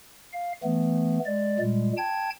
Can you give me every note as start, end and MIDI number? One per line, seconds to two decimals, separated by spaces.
0.34 0.53 77
0.64 1.19 52
0.64 1.19 57
0.64 1.19 59
1.26 1.60 56
1.26 1.60 74
1.60 1.92 46
1.60 1.92 55
1.60 1.92 56
1.97 2.30 79
1.97 2.30 81
1.97 2.30 92